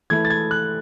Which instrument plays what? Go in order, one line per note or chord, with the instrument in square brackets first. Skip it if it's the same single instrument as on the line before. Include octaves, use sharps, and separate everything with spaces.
[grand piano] E3 A3 E4 G#6
A6
G#6
F#6